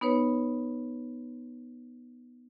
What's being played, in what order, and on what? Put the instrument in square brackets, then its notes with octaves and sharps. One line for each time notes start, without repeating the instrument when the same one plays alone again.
[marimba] B3 D#4 B4 C#5